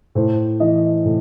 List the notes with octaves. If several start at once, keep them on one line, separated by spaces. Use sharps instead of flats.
A2 C5
E3 D#5
A2